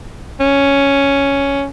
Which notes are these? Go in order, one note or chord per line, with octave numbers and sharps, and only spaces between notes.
C#4